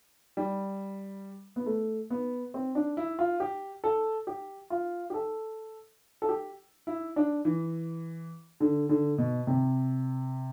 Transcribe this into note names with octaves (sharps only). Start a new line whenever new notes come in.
G3
B3
A3
B3
C4
D4
E4
F4
G4
A4
G4
F4
G4
A4
A4
G4
E4
D4
E3
D3
D3
B2
C3